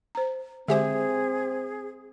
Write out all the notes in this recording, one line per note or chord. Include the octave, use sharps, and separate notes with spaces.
C5 A#5
D3 G#3 C4 G4 G#4 C5 E5 G#5